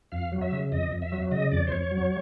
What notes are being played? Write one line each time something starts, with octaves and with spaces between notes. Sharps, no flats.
F2 F5
F#3
E5
C#3
F2 D#5
F2
E5
F#3
C#3 D#5
F2 D5
C5
F2 C#5
F#3